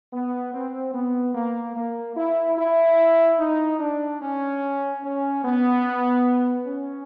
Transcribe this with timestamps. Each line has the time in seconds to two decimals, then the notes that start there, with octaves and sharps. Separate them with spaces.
0.13 B3
0.54 C4
0.95 B3
1.35 A#3
1.76 A#3
2.17 E4
2.58 E4
3.39 D#4
3.80 D4
4.22 C#4
5.04 C#4
5.45 B3
6.66 C#4